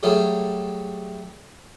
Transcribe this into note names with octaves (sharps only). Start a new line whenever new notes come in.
F#3 G3 A3 G#4